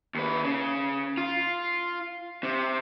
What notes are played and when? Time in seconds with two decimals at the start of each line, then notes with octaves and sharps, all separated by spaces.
0.15 D#2 B4
0.44 C#3
1.17 F4
2.43 C3